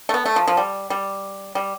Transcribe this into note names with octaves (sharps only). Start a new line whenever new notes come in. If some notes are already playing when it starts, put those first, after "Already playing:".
A3
B3
A3
F3
F3
G3
G3
G3